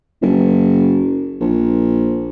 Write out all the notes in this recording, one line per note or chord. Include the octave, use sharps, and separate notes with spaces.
F#1
A#1